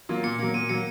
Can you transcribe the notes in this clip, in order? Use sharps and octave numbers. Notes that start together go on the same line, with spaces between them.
F#3 A#3 F4
A#2 C#7
F#3 A#3
A#2 D#7
F#3 A#3 C#7